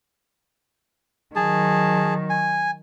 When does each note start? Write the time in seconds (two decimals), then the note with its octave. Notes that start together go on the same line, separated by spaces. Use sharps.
1.36 D#3 F#3 G#4 A5
2.30 G#5